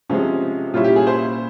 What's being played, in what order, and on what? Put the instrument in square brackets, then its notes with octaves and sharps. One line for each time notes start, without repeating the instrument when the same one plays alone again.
[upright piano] C3 F3 G#3 C4 [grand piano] C#4
[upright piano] A#2 G3 C#4 E4 [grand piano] F4
[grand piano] G4
G#4
C5